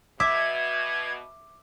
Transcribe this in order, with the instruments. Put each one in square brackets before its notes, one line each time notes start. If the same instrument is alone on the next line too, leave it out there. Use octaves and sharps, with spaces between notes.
[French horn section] B2 [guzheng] E5 [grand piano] D6 [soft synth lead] G#6